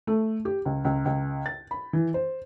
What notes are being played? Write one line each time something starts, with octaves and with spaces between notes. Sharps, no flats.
A3
G4
C#2
C#2
C#2
A6
B5
E3
C5